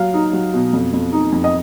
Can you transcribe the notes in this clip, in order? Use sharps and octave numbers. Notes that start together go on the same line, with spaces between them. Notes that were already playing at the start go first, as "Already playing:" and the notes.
Already playing: F#3 F5
D#4
F#3
B2
F2
F2
D#4
F2
D#5